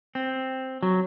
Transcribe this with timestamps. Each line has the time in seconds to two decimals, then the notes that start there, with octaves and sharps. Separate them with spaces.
0.15 C4
0.83 F#3